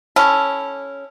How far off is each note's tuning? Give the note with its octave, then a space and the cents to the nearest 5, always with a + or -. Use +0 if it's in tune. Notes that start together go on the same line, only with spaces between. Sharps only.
C#4 +0 E4 +0 A4 +0